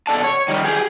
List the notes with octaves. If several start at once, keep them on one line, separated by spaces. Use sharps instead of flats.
B2 A4 D5 A5
C#5
D#3 G3
G4 G#4